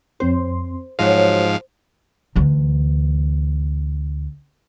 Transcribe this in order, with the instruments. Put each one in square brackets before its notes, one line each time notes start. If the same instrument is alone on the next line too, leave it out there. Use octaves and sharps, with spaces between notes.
[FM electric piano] F2 C4 C6 [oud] C5
[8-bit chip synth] G#2 F3 F5 [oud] F#3 F#4 D#5 [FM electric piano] C5
[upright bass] D2 E3